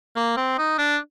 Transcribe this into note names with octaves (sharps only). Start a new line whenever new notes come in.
A#3
C4
D#4
D4